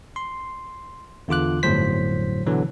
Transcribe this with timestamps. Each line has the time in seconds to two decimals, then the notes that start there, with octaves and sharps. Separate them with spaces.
0.16 C6
1.28 E2 D3 F4 D6 F#6
1.63 G1 F2 A2 F#3 C5 B6
2.46 B2 D3 E3 F#3